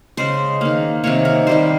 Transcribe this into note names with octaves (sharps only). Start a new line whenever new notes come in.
C#3 G#3 C5
D#3 A#3
C3 D#3 A#3 C#5
A#4
D#3 G3 A#3 C5